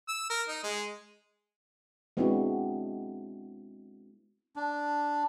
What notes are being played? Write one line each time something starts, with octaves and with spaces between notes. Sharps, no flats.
E6
A#4
D#4
G#3
G#3 B3 C4 D4 E4 F#4
D4